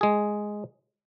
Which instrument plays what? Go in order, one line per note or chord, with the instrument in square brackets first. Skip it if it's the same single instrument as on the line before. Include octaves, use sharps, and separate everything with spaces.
[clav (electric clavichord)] G#3 G#4